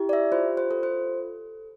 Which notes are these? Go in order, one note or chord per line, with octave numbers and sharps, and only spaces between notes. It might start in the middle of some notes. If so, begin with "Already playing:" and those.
Already playing: E4 G4
D5
E5
F4 C5
C5
A4
C5